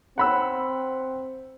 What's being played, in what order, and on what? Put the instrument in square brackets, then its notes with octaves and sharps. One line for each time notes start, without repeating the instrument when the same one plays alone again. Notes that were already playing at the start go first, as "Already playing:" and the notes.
[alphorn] C4 [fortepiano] F#5 B5 E6